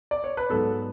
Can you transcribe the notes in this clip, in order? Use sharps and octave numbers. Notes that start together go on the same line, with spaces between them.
D5
C#5
B4
G#2 F#3 B3 A4